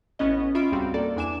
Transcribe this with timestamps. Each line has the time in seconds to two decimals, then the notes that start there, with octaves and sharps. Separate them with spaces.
0.19 A1 B3 C#4 D#5
0.55 C#4 F4 E5 B5 D7
0.72 C#2 G#2 G3 C4 F#4 F5
0.94 A#3 A4 D5
1.16 E2 D4 G#5 D6 E7